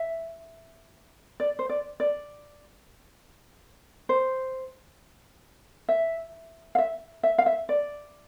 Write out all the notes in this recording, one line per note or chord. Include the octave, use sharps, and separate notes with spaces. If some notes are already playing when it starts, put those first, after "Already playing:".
Already playing: E5
D5
C5
D5
D5
C5
E5
F5
E5
E5
F5
E5
D5